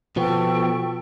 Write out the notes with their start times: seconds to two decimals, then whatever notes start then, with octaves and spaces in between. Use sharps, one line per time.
0.16 B2 F3 B3 A4 G5 C#6